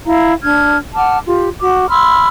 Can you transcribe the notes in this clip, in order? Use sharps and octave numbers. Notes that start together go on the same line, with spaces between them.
E4 F5 A#5
D4 F6 G#6
F#5 A5 D6 F6
F4 G4
F#4 D6
B5 C6 E6 F6